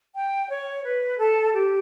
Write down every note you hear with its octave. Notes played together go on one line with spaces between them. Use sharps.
G5
C#5
B4
A4
G4